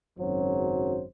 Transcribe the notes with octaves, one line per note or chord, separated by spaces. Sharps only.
G#1 F#2 C#3 F#3 C5